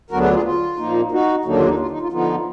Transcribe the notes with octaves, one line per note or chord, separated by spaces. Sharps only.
D2 D3 F#3 B3 D4 F#4 A#4
G#4 B4
F4 G#4
F4
A#2 F3 A#3 D#4
D#4 F#4
D#2 D3 F#3 A#3 D4 D#4
F4
D#4
F4
D#4
F4
D3 F3 B3 D#4 F4